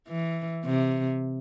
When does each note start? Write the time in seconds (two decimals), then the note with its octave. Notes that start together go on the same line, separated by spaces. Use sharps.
0.08 E3
0.66 C3